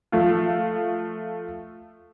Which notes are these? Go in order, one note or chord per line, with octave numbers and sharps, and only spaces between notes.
F3 A3 F4